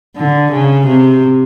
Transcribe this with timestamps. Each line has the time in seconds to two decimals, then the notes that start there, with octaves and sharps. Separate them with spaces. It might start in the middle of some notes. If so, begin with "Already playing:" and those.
0.16 D3
0.51 C#3
0.86 C3